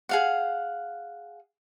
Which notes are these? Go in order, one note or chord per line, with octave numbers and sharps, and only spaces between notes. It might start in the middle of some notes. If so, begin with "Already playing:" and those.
G#4 F5 F#5